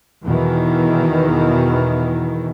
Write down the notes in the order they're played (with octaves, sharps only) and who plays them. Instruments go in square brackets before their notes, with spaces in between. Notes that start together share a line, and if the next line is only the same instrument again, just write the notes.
[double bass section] E2 B2 D#3 E3